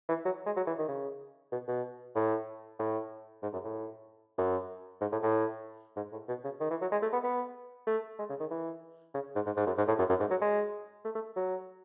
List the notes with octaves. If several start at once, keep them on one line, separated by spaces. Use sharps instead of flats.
E3
F#3
G#3
F#3
E3
D#3
C#3
B2
B2
A2
A2
G#2
F#2
A2
F#2
G#2
A2
A2
G#2
A2
B2
C#3
D#3
E3
F#3
G#3
A3
B3
B3
A3
G#3
C#3
D#3
E3
C#3
G#2
G#2
G#2
F#2
G#2
A2
F#2
F#2
G#2
F#3
G#3
A3
A3
F#3